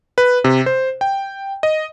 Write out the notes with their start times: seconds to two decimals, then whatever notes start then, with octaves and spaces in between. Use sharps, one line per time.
0.18 B4
0.44 C3
0.66 C5
1.01 G5
1.63 D#5